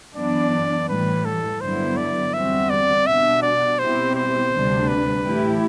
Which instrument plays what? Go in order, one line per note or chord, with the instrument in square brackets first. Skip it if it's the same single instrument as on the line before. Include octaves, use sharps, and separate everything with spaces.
[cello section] F#2 E3 B3 D4 [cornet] D5
[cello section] A2 E3 G3 [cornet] B4
[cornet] A4
[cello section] G2 D3 F#3 B3 E4 [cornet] C5
[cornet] D5
[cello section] E2 D3 G3 C4 F#4 [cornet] E5
[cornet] D5
[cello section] B2 G3 D4 F#4 [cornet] E5
[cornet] D5
[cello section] B2 G3 C4 E4 G4 [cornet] C5
[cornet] C5
[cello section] D2 C3 G3 D4
[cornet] B4
[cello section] A2 E3 A3 E4 G4